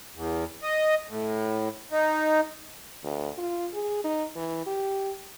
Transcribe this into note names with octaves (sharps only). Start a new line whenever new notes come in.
E2
D#5
A2
D#4
D2
F4
G#4
D#4
E3
G4